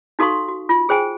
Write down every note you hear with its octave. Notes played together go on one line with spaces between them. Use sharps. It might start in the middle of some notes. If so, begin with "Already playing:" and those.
D#4 F#4 A4 F5 C6 C#6
F#4
F4
G#4 C5 G5 G#5